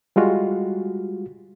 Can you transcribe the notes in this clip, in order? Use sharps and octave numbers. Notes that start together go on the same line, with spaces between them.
G3 G#3 F4 F#4